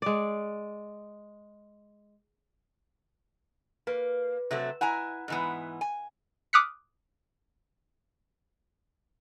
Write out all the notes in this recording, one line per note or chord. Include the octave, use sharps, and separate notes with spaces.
G#3 D5
A#3 B4
C3 F#3 A3 E6
E4 F#5 G#5 A#5
G#2 E3 B3
G#5
D6 D#6 F6 F#6 B6 C#7